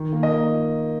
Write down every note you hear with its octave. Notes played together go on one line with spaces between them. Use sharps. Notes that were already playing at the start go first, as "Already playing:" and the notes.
Already playing: D#3
A#3
A#4 D#5
A#3